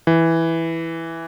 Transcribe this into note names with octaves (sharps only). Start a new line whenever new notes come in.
E3